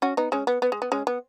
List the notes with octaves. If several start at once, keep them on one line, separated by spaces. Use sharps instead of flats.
C#4 F#4
B3 D#4
G#3 C#4
B3
B3
G#3
B3
G#3 C#4
B3